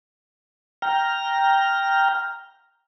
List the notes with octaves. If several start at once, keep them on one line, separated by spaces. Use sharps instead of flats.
G5 A#5 F6